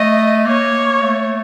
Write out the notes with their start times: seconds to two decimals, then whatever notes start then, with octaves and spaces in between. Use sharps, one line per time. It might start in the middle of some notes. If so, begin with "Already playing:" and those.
Already playing: A3 D#5
0.46 A#3 C#5
1.02 A3